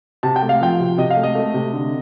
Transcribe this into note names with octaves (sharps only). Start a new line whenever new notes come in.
C3 A5
G5
A3
F5
F3 G5
C3
C3 D#5
F5
A3
D#5
A3
C3
D3